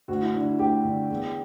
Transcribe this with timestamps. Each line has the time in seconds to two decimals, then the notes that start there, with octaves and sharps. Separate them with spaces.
0.08 D2 F#4
0.22 E4
0.34 D3 D4
0.46 E4
0.59 D2 G4
0.85 D3
1.10 E2